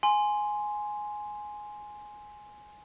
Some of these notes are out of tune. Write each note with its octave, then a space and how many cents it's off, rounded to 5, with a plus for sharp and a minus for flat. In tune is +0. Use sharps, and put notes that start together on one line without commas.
G#5 +5 C6 +0